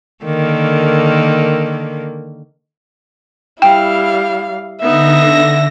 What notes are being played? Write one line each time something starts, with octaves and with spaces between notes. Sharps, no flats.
D3 D#3 A#3
G3 E4 F5 G5
D3 B3 D#4 E5 A#6